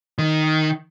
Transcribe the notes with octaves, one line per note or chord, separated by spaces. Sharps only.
D#3